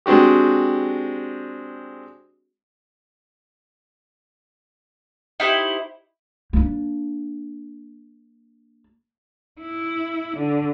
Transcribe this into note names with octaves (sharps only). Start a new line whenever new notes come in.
G#3 C4 D4 F#4 G4
D#4 E4 G4 C5
A#3 D4
E4
D3